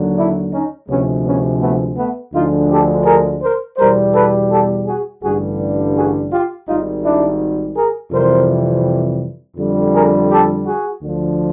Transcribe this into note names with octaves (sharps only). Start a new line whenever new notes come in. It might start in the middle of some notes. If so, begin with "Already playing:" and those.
Already playing: D#2 D3 F#3
D4 E4
C#4 D#4
D2 C3 F3 G#3 B3 C#4
B3 C#4
A3 B3
A3 B3
D2 D3 F3 G#3 D#4 F4
G4 A4
G#4 A#4
A#4 C5
E2 B2 G3 A#4 C5
A4 B4
G4 A4
F#4 G#4
A1 G2 D3 G3 F#4 G#4
F#4 G#4
F4 G4
G#1 G#2 D#3 G3 D#4 F4
D4 E4
G#4 A#4
F2 C3 E3 G3 A#4 C5
F2 D3 G3
G#4 A#4
G4 A4
F#4 G#4
D2 D3 F3